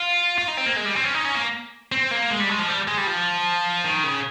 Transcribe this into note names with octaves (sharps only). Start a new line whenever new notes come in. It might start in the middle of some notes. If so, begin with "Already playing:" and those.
Already playing: F4
F4
D#4
C4
A#3
G#3
G3
C4
C#4
D#4
C#4
A#3
C4
A#3
G#3
G3
G#3
F3
G3
G#3
G3
F3
D#3
C#3